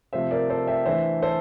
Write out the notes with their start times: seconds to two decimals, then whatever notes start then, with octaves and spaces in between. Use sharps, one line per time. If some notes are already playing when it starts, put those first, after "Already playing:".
0.13 C3 F3 A3 C4 C5 E5
0.31 A#4 D5
0.50 A4 C5
0.67 E5 G5
0.85 E3 A3 D4 C5 E5
1.22 A4 C5